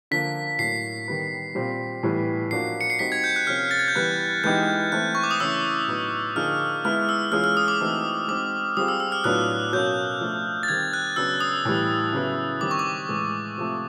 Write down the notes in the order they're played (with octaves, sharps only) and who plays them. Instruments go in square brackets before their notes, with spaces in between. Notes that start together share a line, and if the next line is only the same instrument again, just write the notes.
[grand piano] D3 F3 A#3 [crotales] B6
[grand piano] A2 F#3 A#3 [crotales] C7
[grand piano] D#3 G3 B3
A#2 G3 C4
A2 E3 G3 B3
[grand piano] F3 A#3 D4 F#4 [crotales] C7
[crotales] C#7
C7
[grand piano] G3 C4 D#4 F#4 [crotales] B6
[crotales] G#6
G6
F#6
[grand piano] C3 F3 A#3 C#4 [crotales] F6
[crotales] A6
G#6
G6
[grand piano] E3 G3 B3 [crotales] F#6
[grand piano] E3 G#3 B3 D#4 G4 [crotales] G6
[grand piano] E3 A3 C4 E4 [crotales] F#6
[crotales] C#6
D6
D#6
[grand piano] C#3 E3 A3 C#4 E4 [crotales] E6
[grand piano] A2 F#3 B3 D#4
[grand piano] D3 F3 A#3 D#4 G#4 [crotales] F6
[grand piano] G#3 B3 E4 [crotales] F6
[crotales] E6
[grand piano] E3 G#3 C#4 F4 G#4 [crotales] F6
[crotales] F6
D#6
D6
[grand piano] E3 A3 C4 D#4 F#4
[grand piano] G#3 C4 D#4 F#4 [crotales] D6
[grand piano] G3 C4 F4 G#4 [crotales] D#6
[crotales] E6
E6
F6
[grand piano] A2 F#3 B3 D4 F4 [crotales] F#6
[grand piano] B2 F#3 A#3 C#4 [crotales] G6
[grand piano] F3 A3 D4 F4
[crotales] A6
[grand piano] D#3 G3 C4 [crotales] G#6
[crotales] F#6
[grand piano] C#3 F#3 B3 D4 [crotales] E6
[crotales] D#6
[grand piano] A2 E3 G3
C#3 F#3 B3 E4
[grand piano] D#3 G3 C4 [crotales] D6
[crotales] C#6
D6
[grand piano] A2 E3 G#3
C3 F3 A3